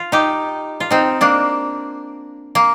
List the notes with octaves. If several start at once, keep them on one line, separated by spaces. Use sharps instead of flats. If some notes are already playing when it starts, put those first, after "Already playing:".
Already playing: F4
D#4 G4
F4
C4 D#4
A#3 D4
A#3